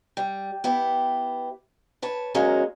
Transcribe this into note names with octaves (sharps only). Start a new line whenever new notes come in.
G3
B3 E4 G4
B4 C#5 A5
E2 F#3 G#3 A#3 C#4 F5